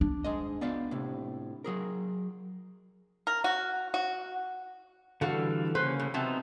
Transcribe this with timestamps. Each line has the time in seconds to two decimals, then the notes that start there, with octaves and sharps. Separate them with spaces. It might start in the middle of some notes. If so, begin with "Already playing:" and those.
0.01 D4
0.24 G#2 G#3 D#5
0.61 B3 D5 F5
0.91 A2 C3
1.64 F#3 G#4 A#4
3.27 A#4
3.44 F#4
3.94 F#4
5.21 D3 E3 G3 F#4 A4 F5
5.75 C#3 A#3 C#4 B4 C5
6.00 A2
6.14 C3 F#3 B3 D#4 C5 A5